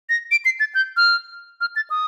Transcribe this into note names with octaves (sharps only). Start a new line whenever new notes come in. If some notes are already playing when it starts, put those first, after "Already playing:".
A#6
D7
C7
A6
G6
F6
F6
A6
D#6